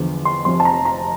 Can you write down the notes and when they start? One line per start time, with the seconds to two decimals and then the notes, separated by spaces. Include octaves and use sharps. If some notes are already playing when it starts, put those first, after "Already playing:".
Already playing: E2 D3 F3
0.25 C6
0.45 F1 F2 C3 F3 C6
0.60 A5
0.65 A#5
0.85 A#5